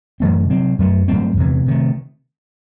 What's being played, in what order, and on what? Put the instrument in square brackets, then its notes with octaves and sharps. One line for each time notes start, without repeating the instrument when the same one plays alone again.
[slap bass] F#2 E3 A3 C4
C3 F#3 C4
F#2 F#3 A3
G2 F#3 A3 C4
E2 C3 E3
C3 D#3 A3